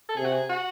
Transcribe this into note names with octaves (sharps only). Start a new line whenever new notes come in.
A4
C3 G#4
F#4
G#4
F#4